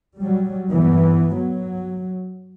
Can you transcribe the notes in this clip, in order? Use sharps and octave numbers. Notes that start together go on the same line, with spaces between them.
F#3 G3
G2 E3 B3
F#3